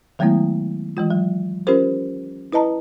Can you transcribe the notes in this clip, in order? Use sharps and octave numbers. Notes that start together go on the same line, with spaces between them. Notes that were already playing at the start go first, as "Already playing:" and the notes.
D#3 F#3 G#3 A3 B3 E4
E3 G#3 F4
F#3
C#4 F4 G4 A#4 C5
E4 B4 D#5 A5 A#5